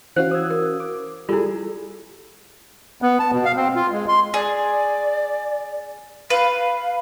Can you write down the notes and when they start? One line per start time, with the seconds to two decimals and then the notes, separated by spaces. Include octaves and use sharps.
0.16 E3 C#4 F#4 C5 F5
0.31 D#6 E6 G#6
0.50 A#4
0.80 D6
1.29 G3 E4 F4 G#4 A4
3.02 B3
3.19 A5
3.32 B2
3.45 F5
3.56 C4
3.75 F4
3.92 G#3
4.09 C6
4.34 G#4 D5
6.30 B4 F5